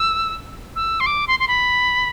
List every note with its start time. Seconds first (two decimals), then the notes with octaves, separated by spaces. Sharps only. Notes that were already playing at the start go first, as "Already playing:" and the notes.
Already playing: E6
0.76 E6
1.00 C6
1.06 D6
1.28 C6
1.40 C6
1.48 B5